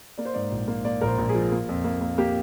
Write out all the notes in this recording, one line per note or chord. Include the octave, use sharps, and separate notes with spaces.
A#3 D5
C5
G#2 D5
A#1
A#3
A#3 D5
A#1 A#4
C5
A#1
G#4
F3
A#3
F2
A#3
A#3
A#3 G4